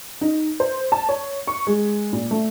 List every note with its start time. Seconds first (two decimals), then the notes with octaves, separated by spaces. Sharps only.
0.21 D#4
0.60 C5
0.92 A5
1.09 C#5
1.47 C#6
1.67 G#3
2.13 A#2
2.31 A3